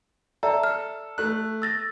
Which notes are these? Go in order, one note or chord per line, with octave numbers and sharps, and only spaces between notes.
A4 D5 E5 A#5
F6
A3 F#6
E6 A6 A#6